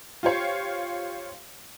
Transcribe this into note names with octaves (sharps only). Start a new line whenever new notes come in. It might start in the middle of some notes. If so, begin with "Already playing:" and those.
F4 G4 C5 C#5 F5